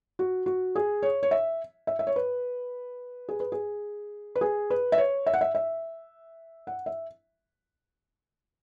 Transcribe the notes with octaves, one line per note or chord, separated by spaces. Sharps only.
F#4
F#4
G#4
C#5
C#5
E5
E5
E5
C#5
B4
G#4
B4
G#4
B4
G#4
B4
E5
C#5
E5
F#5
E5
E5
F#5
E5